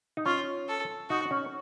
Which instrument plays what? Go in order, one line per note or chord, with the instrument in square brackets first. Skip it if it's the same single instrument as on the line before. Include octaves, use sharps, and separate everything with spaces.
[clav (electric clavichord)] D#4
[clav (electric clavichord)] C#4 [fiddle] F4
[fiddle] A4
[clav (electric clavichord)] D#4 [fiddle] F#4
[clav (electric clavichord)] C#4